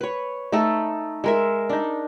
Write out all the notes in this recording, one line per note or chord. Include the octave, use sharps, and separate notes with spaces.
B4 C#5
A3 D#4 A4
G#3 A#4 E5
D4 D#4